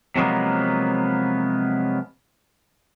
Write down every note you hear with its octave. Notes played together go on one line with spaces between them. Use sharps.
C3 F3 F#3 G#3 A#3 B3